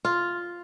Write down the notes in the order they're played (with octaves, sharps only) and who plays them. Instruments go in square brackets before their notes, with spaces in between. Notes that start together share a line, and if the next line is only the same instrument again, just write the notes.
[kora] F4